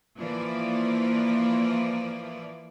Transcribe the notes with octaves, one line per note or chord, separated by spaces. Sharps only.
E3 F3 A#3 E4 D5